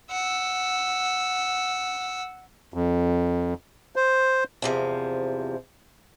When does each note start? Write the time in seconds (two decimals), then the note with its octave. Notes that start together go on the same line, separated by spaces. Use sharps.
0.11 F#5 E6
2.74 F2
3.96 C5
4.62 E2 C3 F3